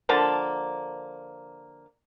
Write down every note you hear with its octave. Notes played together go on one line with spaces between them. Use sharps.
D3 F3 A#3 A5